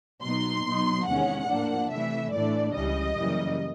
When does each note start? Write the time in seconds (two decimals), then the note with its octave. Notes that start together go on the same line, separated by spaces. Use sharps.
0.22 B2 F#3 B3 D#4 C6
0.64 B2 F#3 B3 D#4
1.06 E2 C3 D#3 G#3 C#4 F#5
1.48 A2 F3 A#3 D4
1.90 C3 E3 A3 E5
2.32 A2 E3 A3 D4 D5
2.74 C#2 C#3 E3 G3 D#5
3.17 F#2 C#3 E3 G3 A#3